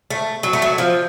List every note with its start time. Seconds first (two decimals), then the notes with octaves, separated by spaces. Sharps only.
0.10 A3
0.43 F#3
0.53 A3
0.62 F#3
0.78 F3